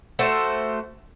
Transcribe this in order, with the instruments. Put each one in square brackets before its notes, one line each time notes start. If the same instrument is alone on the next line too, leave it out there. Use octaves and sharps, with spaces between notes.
[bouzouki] A3 F#4 C5